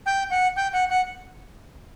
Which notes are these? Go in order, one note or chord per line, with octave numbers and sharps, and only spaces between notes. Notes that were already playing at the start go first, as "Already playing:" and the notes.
G5
F#5
G5
F#5
F#5